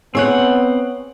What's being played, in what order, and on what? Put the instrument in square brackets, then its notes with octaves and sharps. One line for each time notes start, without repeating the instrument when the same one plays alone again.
[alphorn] B3 [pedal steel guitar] C4 F#5 [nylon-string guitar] G#4 C#5